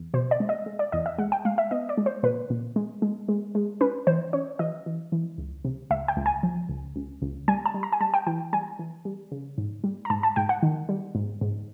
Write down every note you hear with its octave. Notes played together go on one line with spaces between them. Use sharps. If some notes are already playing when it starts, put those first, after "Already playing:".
Already playing: E2
B2 C5
D5
G#3
D#5
G#3
D5
E2 D#5
E5
G#3 F#5
G5
G#3 F5
E5
B3 D#5
D5
G#3
C5
A#2 B4
A#2
G#3
G#3
G#3
G#3
C#4 B4
E3 C5
C#4 C#5
E3 D#5
E3
E3
C#2
C3
C#2 E5
G5
C#2
G#5
F3
C#2
C#2
C#2
G3 G#5
A5
G3
A#5
G#5
G3 A5
G5
E3 G5
G3 G#5
E3
G3
C#3
G#2
G3
A#5
G#2 A5
A5
G#2 G5
F#5
D#3
G3
G#2
G#2